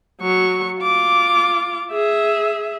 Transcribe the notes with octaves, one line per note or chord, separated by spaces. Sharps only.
F#3 C#6
F4 D6
G#4 E5